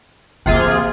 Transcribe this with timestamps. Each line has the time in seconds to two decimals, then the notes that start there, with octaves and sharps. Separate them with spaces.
0.46 C3 E3 A#3 F4 G#4